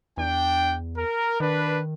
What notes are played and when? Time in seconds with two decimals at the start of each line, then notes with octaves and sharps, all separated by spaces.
0.18 E2 D4 G5
0.97 A#4
1.40 D#3 D4 B4